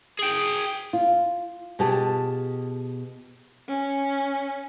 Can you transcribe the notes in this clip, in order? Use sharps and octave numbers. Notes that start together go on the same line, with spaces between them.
G#4 G5
F4
B2 F4 G4 G#4 A5
C#4